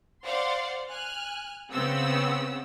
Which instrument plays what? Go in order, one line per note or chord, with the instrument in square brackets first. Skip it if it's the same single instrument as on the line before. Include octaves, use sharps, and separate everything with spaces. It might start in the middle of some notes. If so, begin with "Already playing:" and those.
[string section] C5 D5 F5 F#5 C6
G#5 F6 F#6
C#3 B3 C4 F#5 E6